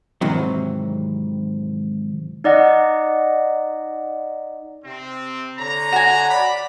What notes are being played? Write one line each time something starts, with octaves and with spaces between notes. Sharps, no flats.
G#2 C3 D#3 E3 F#3
D#4 D5 D#5 F#5
C3 C4
D3 C#5 A#5
F#4 G#5
D5 B5